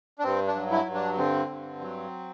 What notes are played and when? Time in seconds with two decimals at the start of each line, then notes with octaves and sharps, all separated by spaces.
0.19 D4
0.24 G2 C4
0.48 D4
0.55 F#3
0.71 E4
0.86 G2
0.94 D4
1.18 D3 C4
1.49 G2
1.80 F#3